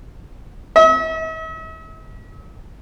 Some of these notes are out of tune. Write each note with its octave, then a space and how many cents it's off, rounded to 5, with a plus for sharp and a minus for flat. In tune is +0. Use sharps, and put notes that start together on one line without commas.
E5 -45